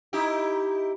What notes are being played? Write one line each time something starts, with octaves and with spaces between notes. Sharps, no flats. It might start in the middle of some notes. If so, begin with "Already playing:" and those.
D#4 E4 G4